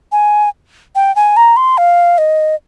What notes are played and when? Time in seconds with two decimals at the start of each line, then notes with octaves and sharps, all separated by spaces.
0.12 G#5
0.95 G5
1.16 G#5
1.37 A#5
1.57 C6
1.78 F5
2.18 D#5